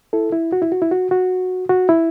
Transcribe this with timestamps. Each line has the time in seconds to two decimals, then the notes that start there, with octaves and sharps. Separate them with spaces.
0.13 E4 A4
0.32 E4
0.53 F#4
0.62 E4
0.72 F#4
0.82 E4
0.91 F#4
1.11 F#4
1.69 F#4
1.89 E4